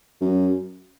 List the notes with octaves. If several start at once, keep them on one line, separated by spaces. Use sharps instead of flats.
F#2